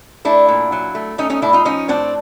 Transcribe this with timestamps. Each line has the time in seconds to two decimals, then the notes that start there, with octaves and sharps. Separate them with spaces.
0.25 A3 D4 E4
0.48 A#2
0.72 F#3
0.95 A3
1.18 A3 C#4 D#4
1.30 C#4 D#4
1.42 A2 D4 E4
1.53 D#4 F4
1.65 F3 C#4 D#4
1.88 A2 C4 D4